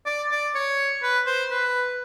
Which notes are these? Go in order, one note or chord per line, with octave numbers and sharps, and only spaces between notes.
D5
D5
C#5
B4
C5
B4